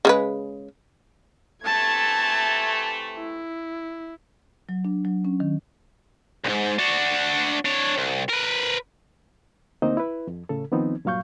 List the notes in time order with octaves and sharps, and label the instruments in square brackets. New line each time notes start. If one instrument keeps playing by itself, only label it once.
[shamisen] C#3 G#3 B4
[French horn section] C3 E3 A3 [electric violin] A5 G#6
[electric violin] E4
[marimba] F#3
D4
F#3
C#4
D#3
[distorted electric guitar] B1 G#2
D4 F#4
D4 C#5
C2
A#4 B4
[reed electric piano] D2 A#3 C4 D#4 C5 D#5
E4 B4
F2
A2 C#3 A4
D#3 F3 B3 C4 D#4
G2 A#2 F#3 F5 C#6 G6